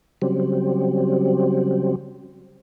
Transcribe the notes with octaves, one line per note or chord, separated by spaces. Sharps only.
C#3 F#3 G3 C4